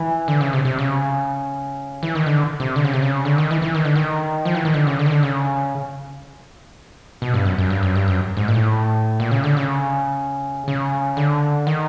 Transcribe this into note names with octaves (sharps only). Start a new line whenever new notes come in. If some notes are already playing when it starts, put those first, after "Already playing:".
Already playing: E3
D3
C#3
C3
C3
C#3
E3
D#3
D3
C3
D3
C#3
C3
C#3
D3
D#3
E3
E3
D#3
D3
D#3
F3
E3
D#3
D3
C#3
D3
D#3
D3
C#3
B2
G2
F#2
F#2
G2
F#2
G2
F#2
G#2
A#2
A2
A#2
C#3
D3
C#3
C#3
D3
D#3